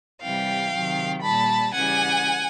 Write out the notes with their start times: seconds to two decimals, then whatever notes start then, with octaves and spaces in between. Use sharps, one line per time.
0.22 C3 E3 G3 F5 G5
0.73 C3 D#3 F#3
1.23 A#2 G3 A5 B5
1.74 C#3 E3 G3 F#5 G#5